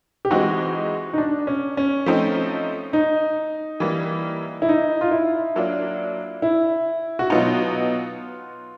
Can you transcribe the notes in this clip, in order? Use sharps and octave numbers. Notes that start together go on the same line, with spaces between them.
G4
E3 G#3 C4 D#4 F#4
D#4
D4
C#4
C#4
F3 A3 C4 D#4
D#4
E3 G3 A#3
E4
D#4
F4
E4
F#3 A#3 D4 F4
E4
F#4
B2 F#3 B3 D#4 F4